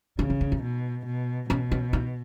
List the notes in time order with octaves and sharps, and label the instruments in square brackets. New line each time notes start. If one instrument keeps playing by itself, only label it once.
[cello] C#3 [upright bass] C#4
[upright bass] D#4
C#4
D#4
[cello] B2
B2
[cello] B2 [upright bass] C#4
[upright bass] C#4
D#4